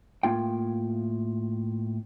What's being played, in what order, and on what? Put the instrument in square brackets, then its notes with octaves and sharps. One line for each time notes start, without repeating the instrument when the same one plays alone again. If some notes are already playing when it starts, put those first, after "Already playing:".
[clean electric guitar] A2 A#3 F4 G5